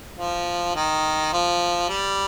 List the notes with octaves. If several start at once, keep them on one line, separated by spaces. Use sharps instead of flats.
F3
D#3
F3
G3